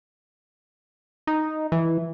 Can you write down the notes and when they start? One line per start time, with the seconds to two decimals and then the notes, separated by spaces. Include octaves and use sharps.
1.27 D#4
1.72 E3